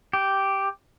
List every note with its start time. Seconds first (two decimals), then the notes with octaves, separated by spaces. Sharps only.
0.13 G4